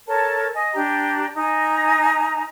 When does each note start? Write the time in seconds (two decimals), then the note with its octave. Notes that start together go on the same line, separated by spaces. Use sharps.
0.07 A4 A#4 C#5 A5
0.53 D#5 G#5
0.73 D4 G4 A#5
1.35 D#4 G#5 A#5